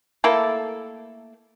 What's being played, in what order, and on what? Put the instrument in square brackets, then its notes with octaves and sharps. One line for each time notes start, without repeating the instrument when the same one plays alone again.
[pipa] A3 A#3 E4 A4